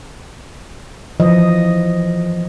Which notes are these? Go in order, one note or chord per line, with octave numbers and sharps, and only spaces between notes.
E3 F3 D#5